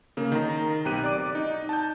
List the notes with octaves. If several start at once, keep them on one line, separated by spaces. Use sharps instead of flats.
C#3 A#3
D#3 A#5
B1 C4 G4 F#6 D#7
D5 D6
D#4
A5 G6